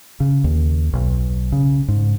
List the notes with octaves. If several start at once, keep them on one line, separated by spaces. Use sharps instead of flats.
C#3
D#2
B1
C#3
G#2